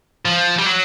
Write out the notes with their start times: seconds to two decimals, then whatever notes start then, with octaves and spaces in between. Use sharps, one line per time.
0.25 F3
0.59 G3
0.67 F#3